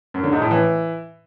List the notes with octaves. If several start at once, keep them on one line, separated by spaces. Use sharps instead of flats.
F#2
D3
G#2
A2
E3